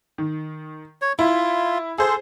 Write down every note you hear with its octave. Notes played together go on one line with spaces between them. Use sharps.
D#3
C#5
E4 F4
G#4 A4 C5